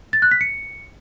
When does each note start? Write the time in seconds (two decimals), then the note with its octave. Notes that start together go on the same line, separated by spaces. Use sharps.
0.13 A6
0.22 F#6
0.31 B6
0.41 C#7